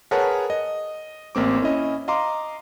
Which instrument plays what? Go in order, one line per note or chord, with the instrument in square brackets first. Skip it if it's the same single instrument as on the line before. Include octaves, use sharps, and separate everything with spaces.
[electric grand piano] G#4 A#4 B4 C#5 F#5 A5
D#5
A1 A#3 C4 D6
C#4 E4 D#5
D#5 F5 A#5 C6 D6